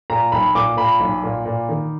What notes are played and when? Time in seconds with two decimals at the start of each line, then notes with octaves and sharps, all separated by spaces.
0.10 A#2 A#5
0.32 B1 B5
0.55 A#2 D6
0.77 A#2 B5
1.00 B1
1.24 A#2
1.46 A#2
1.69 D#3